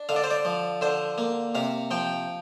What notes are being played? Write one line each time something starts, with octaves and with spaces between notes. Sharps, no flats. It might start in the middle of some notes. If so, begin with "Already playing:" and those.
Already playing: D4
D3 F5
D5
C5
D5
F3
D3 C5
A#3
C3 F5
F3 G5